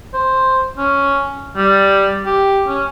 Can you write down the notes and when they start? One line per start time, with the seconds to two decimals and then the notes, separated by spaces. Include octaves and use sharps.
0.14 C5
0.77 C#4
1.56 G3
2.26 G4
2.68 C#4